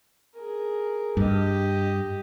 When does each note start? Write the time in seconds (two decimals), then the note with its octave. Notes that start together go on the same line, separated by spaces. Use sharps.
0.35 G#4 A#4
1.17 G2 G4 D#5